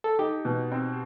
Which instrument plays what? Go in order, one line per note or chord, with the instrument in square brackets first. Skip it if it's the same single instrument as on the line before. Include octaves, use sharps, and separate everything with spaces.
[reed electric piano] A4
[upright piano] D#4 [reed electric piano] G4
[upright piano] B2
C4